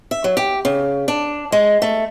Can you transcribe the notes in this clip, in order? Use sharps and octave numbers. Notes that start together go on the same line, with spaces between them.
E5
F#3
G4
C#3
D4
G#3
A3